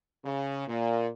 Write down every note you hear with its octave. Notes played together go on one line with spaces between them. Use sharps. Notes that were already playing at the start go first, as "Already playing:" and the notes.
C#3
A#2